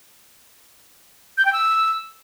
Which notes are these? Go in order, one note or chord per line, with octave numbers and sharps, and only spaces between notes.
G6
G5
E6